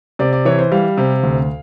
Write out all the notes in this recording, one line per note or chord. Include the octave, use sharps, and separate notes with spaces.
C3 D5
D5
E3 C#5
C5
G3 F5
C3
D2